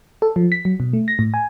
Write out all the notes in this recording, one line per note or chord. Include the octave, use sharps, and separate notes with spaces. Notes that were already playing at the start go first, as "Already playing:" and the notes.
A4
F3
B6
F#3
B2
A3
A#6
A2
G#5